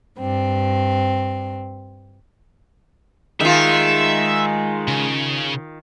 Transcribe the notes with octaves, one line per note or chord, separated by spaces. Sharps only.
G2 C4
D#3 G#3 F4 E5
C#3